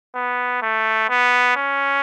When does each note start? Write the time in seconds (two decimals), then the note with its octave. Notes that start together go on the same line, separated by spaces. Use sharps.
0.15 B3
0.62 A3
1.10 B3
1.56 C#4